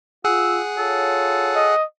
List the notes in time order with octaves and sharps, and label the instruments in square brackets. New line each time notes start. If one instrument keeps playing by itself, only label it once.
[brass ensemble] F4 [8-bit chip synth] G#4 F#5 [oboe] E6
[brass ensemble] F4 C#5 [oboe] A4
[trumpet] D#5